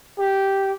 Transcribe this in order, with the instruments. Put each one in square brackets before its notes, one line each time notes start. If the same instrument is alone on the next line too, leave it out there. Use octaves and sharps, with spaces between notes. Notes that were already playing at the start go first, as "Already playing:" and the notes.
[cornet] G4